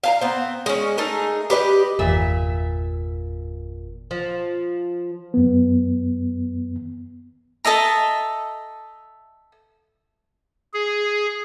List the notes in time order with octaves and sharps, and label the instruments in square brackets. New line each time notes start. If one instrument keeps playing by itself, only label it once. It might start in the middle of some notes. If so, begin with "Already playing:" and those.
[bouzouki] F5 A5 A#5
B3 C4
G#3 C#4
A3 D#4 G#4 A#4
G4 B4 D5 D#5
[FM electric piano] G1 E2 [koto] A#2 E5
[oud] F3
[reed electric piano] F#2 B3
[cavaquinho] A4 D#5 E5 A#5
[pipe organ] G#4